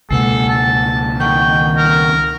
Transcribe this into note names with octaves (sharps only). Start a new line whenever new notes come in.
C#2 B2 G#3 A#3 A4 F#5
A5
D#3 F#5 G5 C#6
A#4